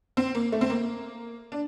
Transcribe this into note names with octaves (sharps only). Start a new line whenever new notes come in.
C4
A#3
A3
C4
A#3
D4